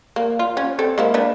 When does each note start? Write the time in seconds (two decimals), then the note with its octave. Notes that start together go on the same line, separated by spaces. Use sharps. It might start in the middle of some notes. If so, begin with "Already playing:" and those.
0.16 A#3
0.39 F4
0.57 C#4
0.79 C4 A4
0.98 G#3 A#3 E4
1.14 A#3 D4 B4